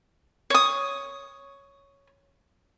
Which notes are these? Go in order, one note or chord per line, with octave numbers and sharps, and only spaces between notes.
C#5 D#6